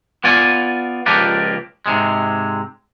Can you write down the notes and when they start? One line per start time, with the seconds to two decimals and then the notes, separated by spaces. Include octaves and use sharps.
0.24 B3 F4 D5 G#5
1.06 C#2 F3 A#3 G4 B4 D5
1.86 G#2 C3 G#3